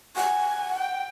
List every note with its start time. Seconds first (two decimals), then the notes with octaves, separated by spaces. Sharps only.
0.16 F#5 G#5
0.78 G5